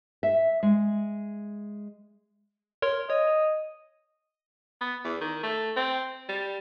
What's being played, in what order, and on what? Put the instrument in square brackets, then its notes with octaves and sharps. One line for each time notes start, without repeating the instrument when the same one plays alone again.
[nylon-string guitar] E5
G#3
[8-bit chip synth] A#4 C#5 C6
[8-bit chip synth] C#5 [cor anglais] D#5
[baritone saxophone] B3
E2
D#3
A3
C4
G3